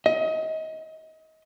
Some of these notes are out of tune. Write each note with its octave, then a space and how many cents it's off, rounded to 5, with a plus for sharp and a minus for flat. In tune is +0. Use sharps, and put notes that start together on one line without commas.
D#5 +30